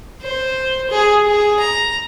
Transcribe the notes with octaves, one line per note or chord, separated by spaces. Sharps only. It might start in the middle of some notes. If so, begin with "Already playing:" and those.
C5
G#4
G#4
A#5